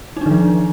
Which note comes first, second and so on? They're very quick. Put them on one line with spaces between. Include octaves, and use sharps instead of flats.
D#4 D4 D#3 F3